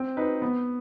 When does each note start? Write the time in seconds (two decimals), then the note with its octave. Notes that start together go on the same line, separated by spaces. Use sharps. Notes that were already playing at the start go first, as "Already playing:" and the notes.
Already playing: C4
0.17 D#4 B4
0.42 B3